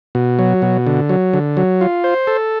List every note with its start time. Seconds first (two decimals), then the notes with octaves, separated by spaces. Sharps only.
0.15 B2
0.39 F#3
0.62 B2
0.87 D3
1.09 F#3
1.33 D3
1.57 F#3
1.81 F4
2.04 C5
2.27 A4